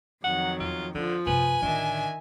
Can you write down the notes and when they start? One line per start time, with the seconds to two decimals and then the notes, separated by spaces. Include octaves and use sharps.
0.24 F2 D#3 F#3 F#5
0.60 E2 F4
0.95 D3 F3 D4
1.27 F#2 C3 B4 G#5
1.62 A1 D3 D#3 D4 E5